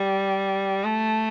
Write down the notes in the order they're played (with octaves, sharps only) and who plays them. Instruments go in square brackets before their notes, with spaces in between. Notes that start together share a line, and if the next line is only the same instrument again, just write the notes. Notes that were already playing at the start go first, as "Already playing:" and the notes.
Already playing: [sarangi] G3
A3